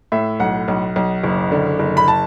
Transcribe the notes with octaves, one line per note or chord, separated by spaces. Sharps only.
A2 E5
B1 F#5
B1
B1
F#1
D3
F#1
B5
A5